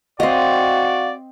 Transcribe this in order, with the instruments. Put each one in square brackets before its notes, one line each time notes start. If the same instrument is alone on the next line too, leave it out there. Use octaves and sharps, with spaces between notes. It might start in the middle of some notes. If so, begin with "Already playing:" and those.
[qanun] C4 D#5 [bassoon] F#4 [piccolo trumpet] D5 [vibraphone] F5